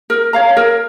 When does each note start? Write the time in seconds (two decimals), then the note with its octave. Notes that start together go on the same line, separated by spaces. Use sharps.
0.10 A#4
0.33 C#5 F5 A#5
0.57 A#4